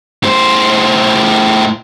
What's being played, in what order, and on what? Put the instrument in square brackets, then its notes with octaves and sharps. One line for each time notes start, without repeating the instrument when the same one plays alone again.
[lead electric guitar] A2 C5